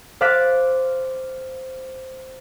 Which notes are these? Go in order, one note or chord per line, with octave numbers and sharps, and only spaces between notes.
C5 F5 D6 F#6 A6 B6